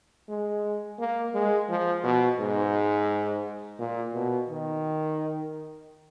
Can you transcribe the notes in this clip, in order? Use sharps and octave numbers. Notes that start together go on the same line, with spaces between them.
G#3
A#3
G#3
F3
B2
G#2
A#2
B2
D#3